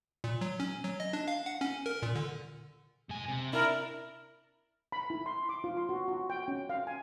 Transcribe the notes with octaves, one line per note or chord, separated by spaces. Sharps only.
A#2
F#3
C#4
F#3
D#5
D4
F5
F#5
C#4
A#4
A#2
D3
G#2 G#5
C3
D4 E4 A#4
B5
E4
C6
D6
F4
C6
F#4
F#4
G5
C#4
F5
G#5